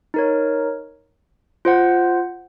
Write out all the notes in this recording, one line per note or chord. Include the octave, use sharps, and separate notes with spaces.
D#4 A#4 C#5
F4 C5 F#5